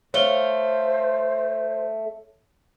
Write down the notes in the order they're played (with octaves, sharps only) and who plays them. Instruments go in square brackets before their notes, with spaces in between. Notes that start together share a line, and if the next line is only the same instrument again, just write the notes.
[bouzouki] A3 F5 [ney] C5 [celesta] C#5 G7